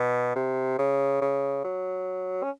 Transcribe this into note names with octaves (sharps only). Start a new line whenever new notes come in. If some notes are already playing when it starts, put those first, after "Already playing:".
Already playing: B2
C3
C#3
C#3
F#3
C#4